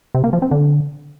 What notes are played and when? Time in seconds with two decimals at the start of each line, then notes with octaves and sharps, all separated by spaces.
0.15 C3
0.24 A#3
0.33 F3
0.42 C4
0.51 D3